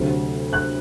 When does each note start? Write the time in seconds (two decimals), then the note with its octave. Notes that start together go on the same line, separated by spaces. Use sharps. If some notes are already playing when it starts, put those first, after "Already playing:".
Already playing: D2 C3 F#3
0.53 F#6